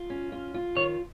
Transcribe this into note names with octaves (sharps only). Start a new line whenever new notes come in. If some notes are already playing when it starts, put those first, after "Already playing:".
Already playing: F4
C#4
F4
F4
D#3 C#5